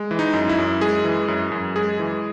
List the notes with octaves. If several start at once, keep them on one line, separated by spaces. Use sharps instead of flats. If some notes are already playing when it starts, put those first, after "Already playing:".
Already playing: G#3
E3
D#4
F#2
E4
F#2
G#3 G#4
E3
F#2
F#2
G#3 G#4
E3